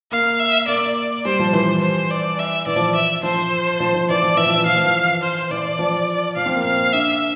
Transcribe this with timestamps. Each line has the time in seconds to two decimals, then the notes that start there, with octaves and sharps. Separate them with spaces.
0.11 A#3 F5
0.39 E5
0.67 A#3 D5
1.25 G3 C5
1.39 F3
1.53 E3 C5
1.81 C5
2.10 D5
2.39 E5
2.67 E3 D5
2.76 F3
2.95 E5
3.23 F3 C5
3.80 F3
3.95 F3
4.09 E3 D5
4.22 F3
4.37 E3 E5
4.47 F3
4.56 E3
4.66 F3 F5
4.76 F3
4.85 E3
5.23 C5
5.51 E3 D5
5.79 F3
6.36 F3 F5
6.46 C4
6.55 A#3
6.64 C4 F5
6.93 D4 E5